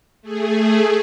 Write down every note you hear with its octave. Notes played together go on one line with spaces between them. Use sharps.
A3 G#4